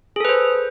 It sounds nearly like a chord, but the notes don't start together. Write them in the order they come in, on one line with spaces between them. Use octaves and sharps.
G#4 A4 B4 C5